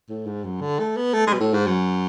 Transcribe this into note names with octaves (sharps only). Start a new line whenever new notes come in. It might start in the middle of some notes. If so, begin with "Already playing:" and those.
A2
G#2
F#2
D3
A3
B3
A3
G#3
B2
A2
G#2
F#2